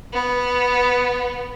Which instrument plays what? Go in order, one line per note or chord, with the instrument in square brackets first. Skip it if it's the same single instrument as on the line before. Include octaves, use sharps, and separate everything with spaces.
[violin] B3